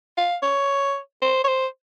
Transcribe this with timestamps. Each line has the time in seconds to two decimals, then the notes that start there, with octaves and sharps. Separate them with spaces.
0.17 F5
0.43 C#5
1.22 C5
1.44 C#5
1.48 C5